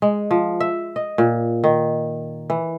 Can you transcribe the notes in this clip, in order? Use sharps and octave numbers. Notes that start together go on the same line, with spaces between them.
G#3
F3
E5
D#5
A#2
D#3
E3